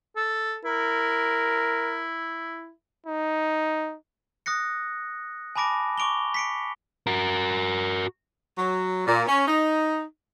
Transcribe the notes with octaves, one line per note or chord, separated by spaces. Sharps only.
A4
E4 A#4
D#4
D#6 F#6 A#6 C#7
G#5 A5 B5 D6 A#6 D7
C#6 D6 D7 F7 G7
B6 C#7 D7
F#4 A#4
F#3
A#2
C#4
D#4